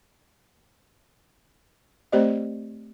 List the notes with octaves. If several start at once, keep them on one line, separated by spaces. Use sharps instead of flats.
A3 C4 G4 C5 D5 D#5